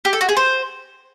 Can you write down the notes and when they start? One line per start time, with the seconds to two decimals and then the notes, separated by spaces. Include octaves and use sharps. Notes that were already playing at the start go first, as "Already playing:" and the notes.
0.05 G4
0.13 A4
0.21 F#4
0.29 G#4
0.37 C5